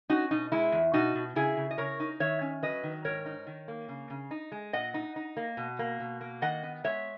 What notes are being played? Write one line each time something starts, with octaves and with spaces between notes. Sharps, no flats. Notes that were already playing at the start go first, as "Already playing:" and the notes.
C#4 D#4 F#4
B2 D#4
G#3 E4
E2
B2 D#4 F#4
B2
C#3 E4 G#4
C#3
D#5
C#3 A#4 C#5
D#4
D#3 C#5 E5
C#4
F#3 B4 D#5
D#3
G#2 A#4 C#5
D#4
D#3
A#3
C#3
C#3
D#4
G#3
A#2 D#5 F#5
D#4
D#4
A#3
B2
A#3
B2
A#3
D#3 D#5 F#5
B3
G#3 C#5 E5